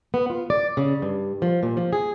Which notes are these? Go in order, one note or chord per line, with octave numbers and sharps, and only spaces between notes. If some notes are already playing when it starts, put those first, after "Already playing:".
B3
F4
D5
C#3
G2
F3
A#2
F3
G#4